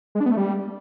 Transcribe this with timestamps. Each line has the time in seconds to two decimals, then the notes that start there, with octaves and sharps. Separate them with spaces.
0.15 G#3
0.20 D4
0.26 B3
0.31 A3
0.37 G3